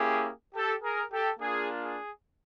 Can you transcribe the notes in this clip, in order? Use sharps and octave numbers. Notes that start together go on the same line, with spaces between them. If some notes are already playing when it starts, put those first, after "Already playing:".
Already playing: A#3 C#4 E4 G4 G#4
G4 A4
G#4 A#4
G4 A4
A#3 D4 F4 G#4
G#4